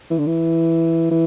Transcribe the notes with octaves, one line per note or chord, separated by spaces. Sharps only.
E3
D3
E3
E3